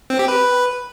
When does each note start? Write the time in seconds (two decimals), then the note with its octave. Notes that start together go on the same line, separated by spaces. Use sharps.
0.10 C4
0.19 G4
0.28 B4